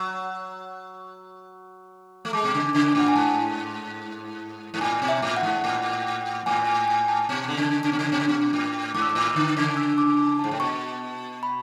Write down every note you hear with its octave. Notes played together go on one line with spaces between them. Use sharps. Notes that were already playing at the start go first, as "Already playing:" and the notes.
Already playing: F#3 E6
A3
G#3 D6
B2
C#3
C#3
A2 F#5
G#5
G#2 A5
G#2
A2 G#5
B2
E5
A2
F#5
G#2
A2
A2 G#5
G#5
G#5
A5
B2
D3
C#3
C#3
B2
C#3
B2
C#3
B2
A2
G#2 D6
E6
D6
A2
D3
C#3
E6
D6
G#2 A5
A2
B2 C#6
B5